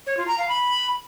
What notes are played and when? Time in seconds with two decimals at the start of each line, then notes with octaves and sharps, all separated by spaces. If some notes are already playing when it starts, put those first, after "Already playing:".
0.07 C#5
0.17 F4
0.28 A#5
0.38 F5
0.49 B5